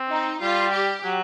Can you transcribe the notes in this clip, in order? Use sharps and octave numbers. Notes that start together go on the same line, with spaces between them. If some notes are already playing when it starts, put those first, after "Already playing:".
Already playing: C4
D#4
G3 F4
G4
F#3